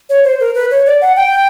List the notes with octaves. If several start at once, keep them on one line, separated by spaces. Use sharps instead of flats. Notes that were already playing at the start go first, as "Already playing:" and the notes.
C#5
C5
A#4
B4
C#5
D5
F#5
G5